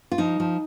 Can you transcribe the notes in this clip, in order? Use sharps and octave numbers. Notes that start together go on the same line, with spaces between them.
F4
F3 D#4
F3